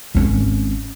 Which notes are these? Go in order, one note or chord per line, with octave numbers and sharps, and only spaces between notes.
G#1 C#4